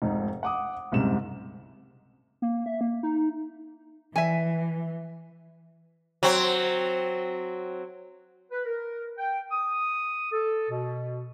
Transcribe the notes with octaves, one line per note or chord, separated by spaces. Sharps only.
F1 G#2 D#4
F#5 D6 D#6
F#1 C2 G#2 C3 E7
A#3
E5
A#3
D#4
E3 E5 G#5
F#3 C4
B4
A#4
G5
D#6
A4
B2